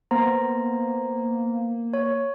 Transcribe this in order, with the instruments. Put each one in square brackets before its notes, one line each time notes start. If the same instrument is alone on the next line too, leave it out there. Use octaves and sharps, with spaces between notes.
[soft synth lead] A#3 [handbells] B3 C5 A#5
[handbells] C#5